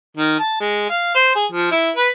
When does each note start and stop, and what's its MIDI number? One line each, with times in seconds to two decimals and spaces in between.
0.17 0.38 51
0.39 0.58 81
0.60 0.88 56
0.90 1.12 77
1.15 1.32 72
1.35 1.46 68
1.52 1.71 53
1.72 1.91 64
1.96 2.09 71